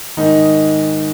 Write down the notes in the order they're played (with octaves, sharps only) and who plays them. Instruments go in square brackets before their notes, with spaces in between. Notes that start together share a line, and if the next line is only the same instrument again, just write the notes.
[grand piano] G#2 D#3 D#4